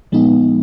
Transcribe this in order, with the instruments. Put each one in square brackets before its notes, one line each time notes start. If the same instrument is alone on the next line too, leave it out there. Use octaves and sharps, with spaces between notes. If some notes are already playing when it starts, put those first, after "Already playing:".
[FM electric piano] A#2 F3 G#3 B3 D#4